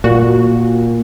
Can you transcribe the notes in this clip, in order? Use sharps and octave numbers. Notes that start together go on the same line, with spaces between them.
A#2 F#4